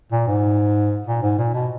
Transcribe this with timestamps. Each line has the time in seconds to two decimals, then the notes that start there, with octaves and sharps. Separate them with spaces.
0.12 A#2
0.28 G#2
1.07 A#2
1.22 G#2
1.39 A#2
1.54 B2